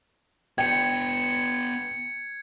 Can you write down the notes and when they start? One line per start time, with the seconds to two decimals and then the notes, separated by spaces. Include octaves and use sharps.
0.58 B3 D4 G5 G#6 C#7